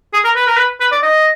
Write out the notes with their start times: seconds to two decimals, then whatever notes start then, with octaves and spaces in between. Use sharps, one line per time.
0.13 G#4
0.24 A#4
0.35 B4
0.47 A#4
0.57 B4
0.81 B4
0.92 D5
1.03 D#5